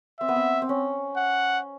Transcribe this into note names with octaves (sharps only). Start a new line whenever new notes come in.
C4 E5
B3
C4
C4
C#4
F#5